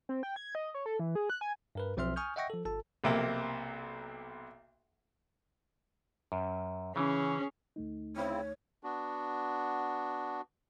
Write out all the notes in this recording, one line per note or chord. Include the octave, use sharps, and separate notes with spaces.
C4
G5
G#6
D#5
C#5
A4
E3
G#4
F#6
G#5
G2 A#4 B4
B1 F3 C4 E5 C6 F6
G#5 C#6 D#6 F6 G6
D#5 E5 F#5 G5 C#6 A#6
F3 A4
G1 A4 A5
B1 C3 A#3
F#2
C#3 E3 C#4 G#4
D2 A3 D#4
C#3 C4 E4 C#5
B3 D4 F#4